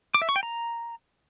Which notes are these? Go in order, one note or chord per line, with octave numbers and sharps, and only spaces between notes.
D6
E5
C#6
G5
A#5